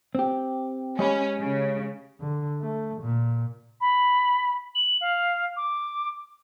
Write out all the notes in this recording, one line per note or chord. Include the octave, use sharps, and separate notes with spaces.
C4 G4
G#3 C#4 G4 B5
C#3
D3
A3
A#2
B5
F#7
F5
D6